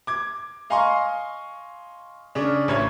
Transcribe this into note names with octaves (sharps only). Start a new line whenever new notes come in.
D6 G#6
D#5 F5 G#5 A#5 C6 C#6
C#3 C#4 D4
A1 C#5 G#6